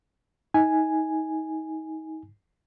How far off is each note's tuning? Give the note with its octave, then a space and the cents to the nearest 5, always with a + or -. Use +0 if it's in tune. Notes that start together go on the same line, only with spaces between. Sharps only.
D#4 +30 G#5 +0